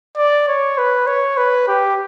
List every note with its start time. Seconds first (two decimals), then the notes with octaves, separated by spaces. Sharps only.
0.17 D5
0.48 C#5
0.78 B4
1.07 C#5
1.37 B4
1.68 G4